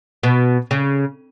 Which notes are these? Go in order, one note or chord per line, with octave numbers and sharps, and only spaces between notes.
B2
C#3